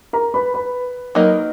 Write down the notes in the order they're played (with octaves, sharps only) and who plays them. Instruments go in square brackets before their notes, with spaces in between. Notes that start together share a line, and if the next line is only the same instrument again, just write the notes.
[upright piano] A#4 A#5
B4 B5
B4 B5
[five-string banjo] F#3 A#3 D#4 A#4 D#5